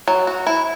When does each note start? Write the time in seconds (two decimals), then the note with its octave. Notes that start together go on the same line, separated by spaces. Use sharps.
0.08 F#3
0.27 F#4
0.47 E4